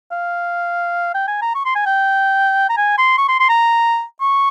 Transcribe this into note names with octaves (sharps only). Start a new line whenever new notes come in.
F5
G5
G#5
A#5
C#6
C6
G#5
G5
A#5
G#5
C6
C#6
C6
C6
A#5
C#6